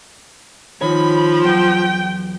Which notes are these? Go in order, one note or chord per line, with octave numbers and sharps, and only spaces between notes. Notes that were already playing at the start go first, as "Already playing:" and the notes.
D#3 F3 C#5 B5
E2 F#3 G5